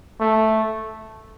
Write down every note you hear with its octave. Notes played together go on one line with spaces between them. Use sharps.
A3